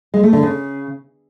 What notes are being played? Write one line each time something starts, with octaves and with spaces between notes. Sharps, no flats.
G#3
A3
D3
C#3